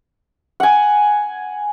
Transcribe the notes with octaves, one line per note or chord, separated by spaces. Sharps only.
F#5 G#5